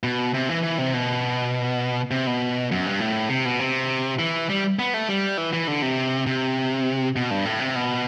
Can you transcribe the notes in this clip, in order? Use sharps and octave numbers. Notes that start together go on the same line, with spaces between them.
B2
C3
E3
E3
C3
B2
C3
B2
F#2
G2
A2
C3
B2
C3
E3
G3
B3
A3
G3
E3
E3
D3
C3
C3
B2
G2
A2
C3
B2